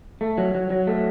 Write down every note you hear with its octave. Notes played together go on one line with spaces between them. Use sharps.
A3
F#3
F#3
F#3
A3